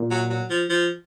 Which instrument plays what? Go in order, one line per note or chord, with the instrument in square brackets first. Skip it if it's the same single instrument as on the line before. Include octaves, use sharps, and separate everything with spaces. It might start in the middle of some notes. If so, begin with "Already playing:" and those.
Already playing: [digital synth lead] A#2
[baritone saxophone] F#3
F#3
F3
F3